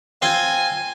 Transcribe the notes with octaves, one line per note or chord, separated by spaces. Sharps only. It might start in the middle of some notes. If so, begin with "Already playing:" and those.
C4 F4 G#5 C6